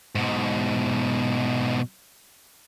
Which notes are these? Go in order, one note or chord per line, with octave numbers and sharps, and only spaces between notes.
G#2 B2